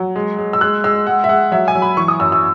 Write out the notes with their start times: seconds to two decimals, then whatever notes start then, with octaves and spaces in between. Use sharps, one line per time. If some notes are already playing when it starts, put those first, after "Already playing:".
Already playing: F#3
0.16 G#3
0.38 G#3
0.53 E6
0.61 G#3 F#6
0.84 G#3 E6
1.07 G#3 F#5
1.24 E5
1.29 G#3 F#5
1.52 F#3 E5
1.68 G#5
1.75 F#3
1.82 B5
1.97 E3 C#6
2.08 D#6
2.20 F#2 E6
2.32 E6